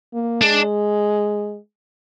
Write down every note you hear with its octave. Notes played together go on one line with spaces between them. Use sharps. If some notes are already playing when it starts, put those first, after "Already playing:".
A#3
G#3 D4